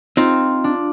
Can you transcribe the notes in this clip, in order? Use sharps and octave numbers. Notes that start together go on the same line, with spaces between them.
C4 D#4 F4
D4